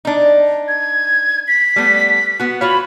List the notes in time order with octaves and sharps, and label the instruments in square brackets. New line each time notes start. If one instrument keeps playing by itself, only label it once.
[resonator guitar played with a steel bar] D4 D#4
[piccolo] G#6
B6
[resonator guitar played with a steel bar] G3 A3 B3
B3 F#4
[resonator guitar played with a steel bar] F4 F#4 C#5 [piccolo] B5